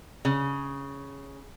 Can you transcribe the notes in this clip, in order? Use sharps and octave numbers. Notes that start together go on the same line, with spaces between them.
C#3